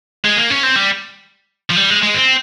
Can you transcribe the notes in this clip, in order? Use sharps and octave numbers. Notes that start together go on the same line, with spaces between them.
G#3
A#3
C#4
C4
G3
F3
G3
G#3
G#3
C4